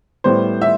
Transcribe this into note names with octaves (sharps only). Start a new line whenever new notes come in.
A2 G3 B3 C5
E5